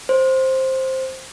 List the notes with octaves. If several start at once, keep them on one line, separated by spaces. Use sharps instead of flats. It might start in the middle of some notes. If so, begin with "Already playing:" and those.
C5